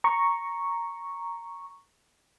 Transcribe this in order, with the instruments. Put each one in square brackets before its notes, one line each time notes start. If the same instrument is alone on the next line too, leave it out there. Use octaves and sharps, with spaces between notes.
[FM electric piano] A#5 C#6